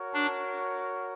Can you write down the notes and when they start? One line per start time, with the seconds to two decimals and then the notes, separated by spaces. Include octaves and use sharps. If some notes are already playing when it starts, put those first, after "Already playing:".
Already playing: F#4 A#4 C#5
0.14 D4